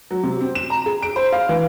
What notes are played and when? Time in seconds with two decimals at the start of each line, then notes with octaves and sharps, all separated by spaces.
0.11 F#3
0.23 C3
0.41 C4
0.55 E7
0.70 A#5
0.86 G#4
1.02 D7
1.16 C5
1.32 F5
1.49 E3